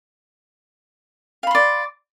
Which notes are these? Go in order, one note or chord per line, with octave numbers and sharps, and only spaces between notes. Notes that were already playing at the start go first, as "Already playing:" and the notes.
D5 F5 B5 C6